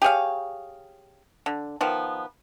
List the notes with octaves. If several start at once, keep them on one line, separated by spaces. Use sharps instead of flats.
G4 G#4 C#5 F5
D3
D#3 F3 B3